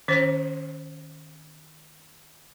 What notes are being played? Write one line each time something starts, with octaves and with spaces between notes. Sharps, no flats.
D#3 C#4 C5